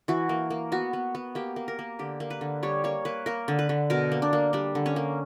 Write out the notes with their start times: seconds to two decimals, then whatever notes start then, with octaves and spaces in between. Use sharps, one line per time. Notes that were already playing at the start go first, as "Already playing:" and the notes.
0.08 E3 F#4
0.29 A#3
0.50 A#3
0.72 B3 F#4
0.93 B3
1.15 B3
1.35 A#3 G4
1.56 A#3
1.68 A#4
1.79 A#3
1.99 D3 G4
2.20 A#3
2.30 B4
2.41 D3
2.63 G3 C#5
2.84 A#3 C#5
3.05 A#3 B4
3.26 A#3 A#4
3.48 D3
3.59 B4
3.69 D3
3.90 B2 A#4
4.12 A#3
4.22 D4
4.33 A#3
4.53 G3 D4
4.75 D3
4.86 C#4
4.96 A#3